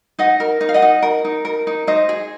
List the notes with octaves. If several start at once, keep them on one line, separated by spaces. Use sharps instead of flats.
D#4 D#5 F#5
A#4
D#4
F5
D#5 F#5
D#4
A#4
D#4
A#4
D#4
D#4 C5 D#5
G#4